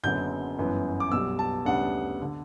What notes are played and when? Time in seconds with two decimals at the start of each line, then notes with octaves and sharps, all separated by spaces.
0.03 F#1 F#2 D3 F#3 B3 G6
0.58 G1 F#2 E3 B3
1.00 D6
1.11 B1 B2 G3 E6
1.39 A5
1.65 D2 C#3 G3 B3 D4 F#5
2.22 D3